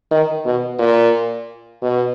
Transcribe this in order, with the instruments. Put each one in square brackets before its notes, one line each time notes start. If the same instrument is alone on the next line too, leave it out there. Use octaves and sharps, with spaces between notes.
[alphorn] D#3
B2
A#2
B2